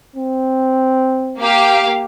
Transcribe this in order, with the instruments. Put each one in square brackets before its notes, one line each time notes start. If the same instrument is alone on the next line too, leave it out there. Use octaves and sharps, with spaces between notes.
[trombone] C4
[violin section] A#3 G4 F5